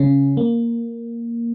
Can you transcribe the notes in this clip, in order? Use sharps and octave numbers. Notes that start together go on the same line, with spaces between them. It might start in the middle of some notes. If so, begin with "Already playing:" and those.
Already playing: C#3 C#4
A#3